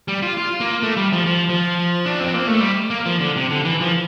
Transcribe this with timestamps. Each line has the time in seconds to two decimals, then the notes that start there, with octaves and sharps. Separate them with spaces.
0.08 G3
0.22 F4
0.37 F4
0.60 A#3
0.83 A3
0.97 G3
1.12 F3
1.26 F3
1.49 F3
2.06 D4
2.20 C4
2.34 A#3
2.47 A3
2.61 G3
2.90 A#3
3.06 F3
3.20 D3
3.36 C3
3.50 D3
3.65 E3
3.81 F3